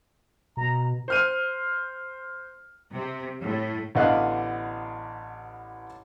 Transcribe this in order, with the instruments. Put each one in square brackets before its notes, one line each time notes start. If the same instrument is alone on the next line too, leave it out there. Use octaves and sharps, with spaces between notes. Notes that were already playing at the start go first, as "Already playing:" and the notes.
[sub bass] B2 [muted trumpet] A#5
[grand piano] C5 F6 D#7
[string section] C3
A2
[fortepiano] A1 D3 B3 D#5 F5 F#6